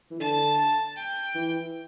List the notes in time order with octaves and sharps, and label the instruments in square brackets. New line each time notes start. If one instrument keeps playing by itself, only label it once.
[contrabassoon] E3
[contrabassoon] D3 [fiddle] A5
[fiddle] G5
[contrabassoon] E3